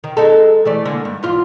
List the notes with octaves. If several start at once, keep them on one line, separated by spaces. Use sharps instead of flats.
D#3
G#3 D#4 A4
E3 A3 D5
D3 G#3 A#3
G2
E2 G#2 F4